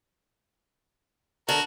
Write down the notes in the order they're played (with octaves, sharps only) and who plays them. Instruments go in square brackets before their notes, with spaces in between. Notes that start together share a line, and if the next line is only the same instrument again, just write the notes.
[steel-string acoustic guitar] D3 [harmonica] F#4 A#4